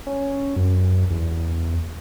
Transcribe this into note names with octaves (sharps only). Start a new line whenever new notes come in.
C#4
F#2
E2